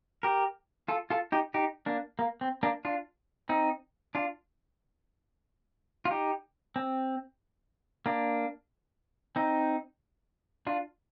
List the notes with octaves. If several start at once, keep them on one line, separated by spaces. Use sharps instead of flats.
G4 A#4
F4 A4
F4 A4
D#4 G4
D#4 G4
A#3 D4
A#3
C4
A#3 D4
D4 F4
C4 D#4
D4 F4
F4
D#4 G4
C4
A#3 D4
C4 D#4
D4 F4